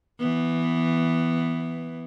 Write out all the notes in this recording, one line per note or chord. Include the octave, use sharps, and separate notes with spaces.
E3 B3